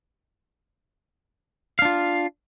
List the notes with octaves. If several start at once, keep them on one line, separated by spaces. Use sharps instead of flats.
D4 F4 F5